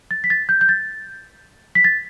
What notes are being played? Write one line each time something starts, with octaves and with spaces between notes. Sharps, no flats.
A6
B6
A6
G6
G6
A6
B6
A6